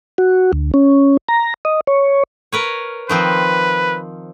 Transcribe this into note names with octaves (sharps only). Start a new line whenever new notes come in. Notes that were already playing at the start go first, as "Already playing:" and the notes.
F#4
D2
C#4
A#5
D#5
C#5
A#4 B4 C#5
D#3 F3 C4 B4